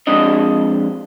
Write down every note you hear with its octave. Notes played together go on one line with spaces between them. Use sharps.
F2 G#3 D4 D#5